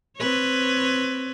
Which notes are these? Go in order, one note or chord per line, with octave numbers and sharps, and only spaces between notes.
C4 B4 C#5